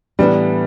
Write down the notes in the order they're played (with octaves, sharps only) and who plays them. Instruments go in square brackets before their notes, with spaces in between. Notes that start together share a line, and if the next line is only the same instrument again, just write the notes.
[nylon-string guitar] A2 E3 B3 D4 [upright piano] G3